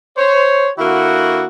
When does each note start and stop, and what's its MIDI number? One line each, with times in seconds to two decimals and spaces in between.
0.18 0.69 72
0.18 0.69 73
0.79 1.46 50
0.79 1.46 58
0.79 1.46 64
0.79 1.46 66